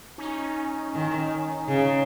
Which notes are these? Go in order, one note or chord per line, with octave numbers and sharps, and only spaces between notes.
C#4 D#4
D#3
C#3